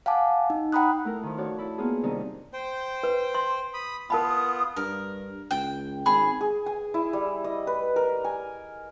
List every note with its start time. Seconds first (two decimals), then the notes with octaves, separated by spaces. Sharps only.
0.06 F5 F#5 G#5 A5 D6
0.50 D#4
0.72 F#5 G5 A#5 B5 D#6 F#6
1.05 A3 E4 A#4
1.23 D#3 F3
1.37 D4 F#4 C#5 D5
1.58 E4 A5 B5
1.78 A#3 B3 F4 G#4
2.03 C3 D#3 G3 D4 D#4
2.53 C5 G5
3.03 B4
3.34 C6
3.74 B5 D#6
4.10 B3 F4 A#4 A5 B5
4.24 D#6
4.77 G2 A#4
5.51 C#2 G5
6.06 G#1 G#4 B5
6.41 G#4
6.66 G#5
6.94 E4
7.13 G3
7.44 D#5
7.67 B4
7.96 A#4
8.24 G#5